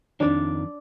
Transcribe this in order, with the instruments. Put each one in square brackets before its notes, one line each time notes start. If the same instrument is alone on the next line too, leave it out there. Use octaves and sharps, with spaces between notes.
[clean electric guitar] F2 D#3 [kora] D4 D5